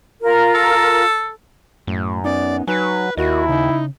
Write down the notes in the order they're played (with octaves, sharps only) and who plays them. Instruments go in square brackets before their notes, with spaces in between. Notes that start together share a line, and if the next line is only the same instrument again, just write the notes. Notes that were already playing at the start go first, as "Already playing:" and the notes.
[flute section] F4 A#4
[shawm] A4
[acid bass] F#2 [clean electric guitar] A2
[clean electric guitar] B3 C#4 D#4 [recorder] D5
[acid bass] F#3 [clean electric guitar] D#4 G#5 [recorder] B4
[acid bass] D#2 [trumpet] E4 [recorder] F#4 [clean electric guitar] A#4 D#5
[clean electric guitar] C#3 [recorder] D#4